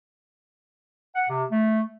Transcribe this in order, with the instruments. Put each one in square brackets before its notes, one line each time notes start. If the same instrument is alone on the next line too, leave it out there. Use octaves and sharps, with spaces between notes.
[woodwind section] F#5
C3
A3